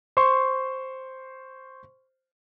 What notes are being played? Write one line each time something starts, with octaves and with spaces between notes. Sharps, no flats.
C5 C6 C#6